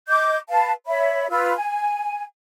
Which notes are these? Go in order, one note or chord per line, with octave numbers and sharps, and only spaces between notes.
D#5 D6 G6
B4 F5 A5
C#5 E5 B5
F4 B4 E6
G#5